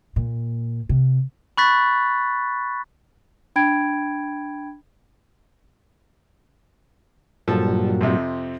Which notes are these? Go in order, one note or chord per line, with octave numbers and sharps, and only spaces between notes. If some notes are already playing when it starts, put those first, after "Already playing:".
A#2
C3
B5 C#6 F#6 A6 B6
D4 G5 B5 G#6 D7
G2 A#2 F3 F#3 A4
F2 C3